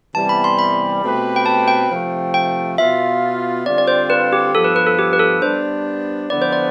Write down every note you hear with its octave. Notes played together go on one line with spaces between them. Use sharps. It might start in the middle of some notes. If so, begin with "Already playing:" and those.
C3 E3 G3 B3 A5
B5
C6
B5
B2 A3 C4 G4 B4
G5
A5
G5
C3 F3 A3
G5
B2 B3 F4 E5
D3 G3 C4 F4 D5
D5
C5
B4
G4
G2 F3 B3 A4
B4
B4
A4
G4
B4
A4
G3 B3 D4 C5
D3 F3 B3 E4 B4 D5
C5
D5